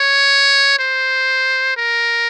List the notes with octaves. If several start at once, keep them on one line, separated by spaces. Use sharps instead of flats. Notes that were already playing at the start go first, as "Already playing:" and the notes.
Already playing: C#5
C5
A#4